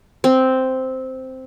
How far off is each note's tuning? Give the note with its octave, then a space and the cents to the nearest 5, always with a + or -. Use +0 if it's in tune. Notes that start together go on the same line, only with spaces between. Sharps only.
C4 -5